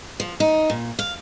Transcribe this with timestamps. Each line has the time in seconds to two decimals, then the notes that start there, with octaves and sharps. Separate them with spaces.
0.20 F3
0.40 D#4
0.70 A#2
0.99 F5